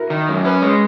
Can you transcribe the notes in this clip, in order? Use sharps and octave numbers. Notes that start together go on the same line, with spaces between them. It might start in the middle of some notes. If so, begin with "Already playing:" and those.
Already playing: E4 F#4 A#4
D#3
F#2
C#4 B4
G#3 C#5